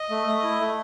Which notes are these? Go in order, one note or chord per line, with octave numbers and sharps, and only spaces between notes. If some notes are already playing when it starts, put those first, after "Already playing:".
Already playing: D#5
A3
A3
E4
A3